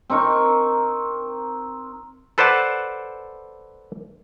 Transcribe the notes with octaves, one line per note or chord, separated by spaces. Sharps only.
C4 D#4 A#4 C#6
A4 B4 C5 D5 F#5 A5